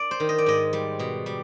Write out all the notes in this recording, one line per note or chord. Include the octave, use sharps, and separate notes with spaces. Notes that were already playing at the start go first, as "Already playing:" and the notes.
Already playing: D5
C5
D#3
D#5
D5
G#2 D#5
G3
B2
G3